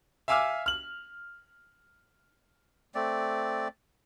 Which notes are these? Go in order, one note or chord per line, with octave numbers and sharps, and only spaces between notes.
E5 F5 G#5 D6 E6 F6
F6 F#7
A3 C4 D5